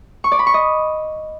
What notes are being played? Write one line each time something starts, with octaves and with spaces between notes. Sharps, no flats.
C#6
D5
B5
C#6
D#5